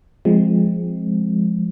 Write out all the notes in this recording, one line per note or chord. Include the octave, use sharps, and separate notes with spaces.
F3 G#3 C4